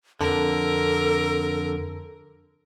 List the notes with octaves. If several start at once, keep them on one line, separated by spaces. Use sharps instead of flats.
F2 D3 A4 A#4